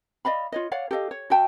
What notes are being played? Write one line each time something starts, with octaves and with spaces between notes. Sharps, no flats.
D5 D#5 F5 B5
F4 C#5 D#5
C#5 D5 F5 F#5
G4 A4 D#5 F5
C#5
F#4 E5 G5 A5